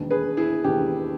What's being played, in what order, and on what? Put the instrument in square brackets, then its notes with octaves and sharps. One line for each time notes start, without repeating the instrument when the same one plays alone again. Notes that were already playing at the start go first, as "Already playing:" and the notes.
Already playing: [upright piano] E1 D#2 D#3
G#4 B4
E4 G#4
E1 D#2 D#3 G4